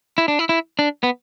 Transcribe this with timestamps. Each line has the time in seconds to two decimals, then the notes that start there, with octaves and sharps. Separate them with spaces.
0.18 E4
0.28 D4
0.39 E4
0.49 E4
0.79 D4
1.03 B3